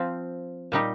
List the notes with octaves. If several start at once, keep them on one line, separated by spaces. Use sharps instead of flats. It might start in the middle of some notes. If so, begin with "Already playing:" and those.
Already playing: F3 C4 F4
A#2 G3 D#4 G4